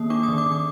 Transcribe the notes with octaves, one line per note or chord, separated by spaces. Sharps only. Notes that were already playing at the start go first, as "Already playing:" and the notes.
Already playing: D#3 A#3 D#6
D4 D6
D#6
D#3
D6
D#3
D6